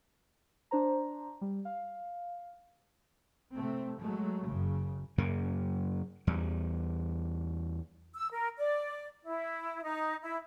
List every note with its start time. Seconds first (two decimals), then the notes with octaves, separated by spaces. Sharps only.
0.71 D4 C5 A#5
1.41 G3
1.65 F5
3.55 C3 A3 C4
4.00 F#3 G#3 A3
4.46 F#1 F#2 C#3
5.18 F#2 C#3 A#3
6.27 E2 G3
8.15 E6
8.32 A#4
8.58 D5
9.25 E4
9.83 D#4
10.22 E4